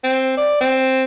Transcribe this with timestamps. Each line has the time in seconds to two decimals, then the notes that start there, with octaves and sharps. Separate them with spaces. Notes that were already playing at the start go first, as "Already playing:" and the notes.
0.04 C4
0.37 D5
0.61 C4